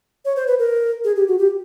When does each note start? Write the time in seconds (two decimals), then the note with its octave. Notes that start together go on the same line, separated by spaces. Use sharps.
0.25 C#5
0.36 C5
0.47 B4
0.59 A#4
1.04 G#4
1.16 G4
1.28 F#4
1.38 G4